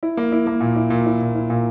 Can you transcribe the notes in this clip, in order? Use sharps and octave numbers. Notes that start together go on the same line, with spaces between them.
E4
A#3
E4
A#3
A#2
E4
A#2
E4
A#2
E4
A#2